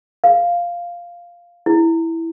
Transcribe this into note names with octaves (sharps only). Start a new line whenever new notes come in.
F5
E4